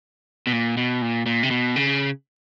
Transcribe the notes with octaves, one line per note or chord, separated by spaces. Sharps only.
B2
A#2
B2
A#2
A#2
C3
B2
C#3